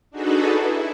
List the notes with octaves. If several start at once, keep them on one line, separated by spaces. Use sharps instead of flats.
D4 D#4 F#4 G#4 A4 B4
E4